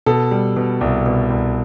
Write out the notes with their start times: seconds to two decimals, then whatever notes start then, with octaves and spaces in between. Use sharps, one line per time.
0.06 B2 A4
0.31 G3
0.56 B2
0.81 C2
1.06 B2
1.30 C2